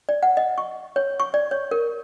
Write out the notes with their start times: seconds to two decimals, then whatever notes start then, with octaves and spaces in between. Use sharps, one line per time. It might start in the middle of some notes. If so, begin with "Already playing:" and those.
0.09 D5
0.23 F#5
0.37 D#5
0.58 C#6
0.96 C#5
1.20 C#6
1.34 D5
1.51 C#5
1.71 A#4